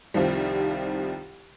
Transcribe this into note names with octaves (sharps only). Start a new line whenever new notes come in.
C2 D#3 F3 G3